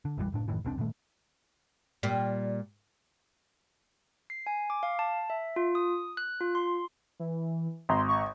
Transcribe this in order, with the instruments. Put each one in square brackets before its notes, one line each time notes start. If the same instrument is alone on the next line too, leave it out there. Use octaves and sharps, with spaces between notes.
[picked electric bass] D3
A#1 F2 E3 G3
F#1 A2 D4
F#2 A2 D#3 E3
E1 C2 C4 D4
G2 A#2 D#3 A3
[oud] A#2 G3
[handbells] C7
G#5
D6
F5
A5
E5
F4
D#6
F#6
F4
C6
[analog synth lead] E3
[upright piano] G#1 A#5 [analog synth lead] C6
[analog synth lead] C#6